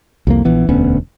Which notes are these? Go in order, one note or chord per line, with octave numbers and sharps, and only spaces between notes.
C2 F2 A#3
A#1 E3 B3
E1 D2 B3 C#4